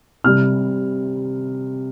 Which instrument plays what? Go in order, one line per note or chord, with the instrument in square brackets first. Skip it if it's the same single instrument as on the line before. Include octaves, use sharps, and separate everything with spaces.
[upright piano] C3 G3 F6